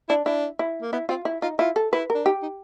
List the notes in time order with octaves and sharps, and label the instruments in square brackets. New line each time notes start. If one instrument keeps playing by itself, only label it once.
[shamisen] D4 [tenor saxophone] E4
[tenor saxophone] D4 [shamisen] E4
[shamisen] E4
[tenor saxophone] A#3
[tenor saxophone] B3 [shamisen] E4
[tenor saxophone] C4 [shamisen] F4
[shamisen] E4
[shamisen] D#4 [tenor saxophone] F4
[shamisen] E4 [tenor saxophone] F4
[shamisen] A4
[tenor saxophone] E4 [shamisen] B4
[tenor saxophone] D4 [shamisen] A#4
[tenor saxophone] D#4 [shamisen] G4
[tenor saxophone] D#4